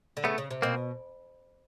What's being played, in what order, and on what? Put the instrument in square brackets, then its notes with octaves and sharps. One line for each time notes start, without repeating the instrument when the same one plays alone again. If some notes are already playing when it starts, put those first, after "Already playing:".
[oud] D3
[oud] C#3 [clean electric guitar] A3 B3
[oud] C#3
C3
[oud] B2 [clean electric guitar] A#3 C4